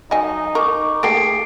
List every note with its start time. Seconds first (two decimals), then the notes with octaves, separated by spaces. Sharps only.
0.11 F#3 D#4 D#5 G#5
0.55 A#4 C#6 D6
1.03 A3 A#3 G4 G#4 G5 C7 D7